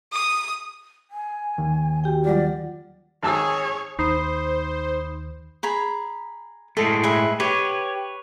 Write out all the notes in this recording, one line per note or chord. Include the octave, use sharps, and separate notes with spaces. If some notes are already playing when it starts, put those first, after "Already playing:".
D#6
G#5
D#2
F#4 G4 G5
F#3 G3 F4 D5
G#1 G#4 C#5 A5 E6
D#2 D#4 C5 B5 D#6 C7
G#4 A#5 B5
A2 G#3 A3 A4
G#4 B4 E5
G4 B4 C#5